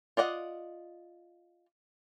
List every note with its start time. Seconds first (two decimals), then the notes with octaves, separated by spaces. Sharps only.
0.17 F4 D5 D#5 F#5